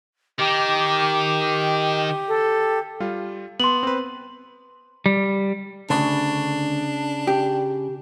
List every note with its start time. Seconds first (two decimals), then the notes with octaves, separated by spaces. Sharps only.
0.39 D#3 G4 D6
2.28 A4
3.00 G3 F4
3.60 B3 C6 F#7
3.83 C4 B4
5.06 G3
5.90 D2 C#3 D4
7.27 G4